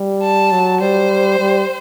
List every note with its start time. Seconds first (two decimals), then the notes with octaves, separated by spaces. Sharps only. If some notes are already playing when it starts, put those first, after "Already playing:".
Already playing: G3
0.22 A5
0.52 F#3
0.81 G3 C5
1.39 G3